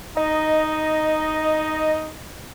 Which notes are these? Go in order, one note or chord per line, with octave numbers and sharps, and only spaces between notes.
D#4 D#5